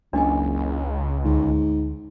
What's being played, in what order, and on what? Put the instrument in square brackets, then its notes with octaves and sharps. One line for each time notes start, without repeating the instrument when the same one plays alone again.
[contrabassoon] F#1 [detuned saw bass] C#2 [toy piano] D4 D#5 G#5
[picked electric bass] D2 [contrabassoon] G#2